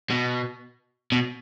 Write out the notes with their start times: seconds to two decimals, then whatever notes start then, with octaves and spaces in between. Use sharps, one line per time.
0.10 B2
1.12 B2